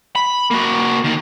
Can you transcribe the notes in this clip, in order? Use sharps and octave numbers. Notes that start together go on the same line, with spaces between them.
B5
A#3 F#4
D#3 A#3